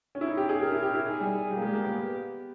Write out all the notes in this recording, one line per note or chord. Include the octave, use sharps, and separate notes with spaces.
C#4
E4
D#4
G4
G#4
G4 A#4
E4
G4
E4
D#4 G#4
G3
G3 G4
A#3
G#3
A#3
B3